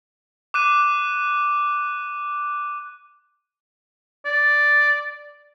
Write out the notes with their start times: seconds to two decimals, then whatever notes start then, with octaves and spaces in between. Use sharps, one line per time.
0.54 D6 F#6 D#7
4.25 D5